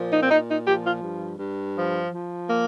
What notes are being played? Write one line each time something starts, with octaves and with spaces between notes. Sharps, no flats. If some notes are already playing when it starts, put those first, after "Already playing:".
Already playing: A#2 F3
D#4
C4
A#2 D#4
D#4
F3 G4
F4
G2
G2
F3
F3
A#3